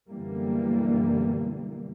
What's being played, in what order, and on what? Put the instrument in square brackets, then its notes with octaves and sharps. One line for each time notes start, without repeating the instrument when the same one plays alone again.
[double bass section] F#2 B2 D3 E3 G3 A#3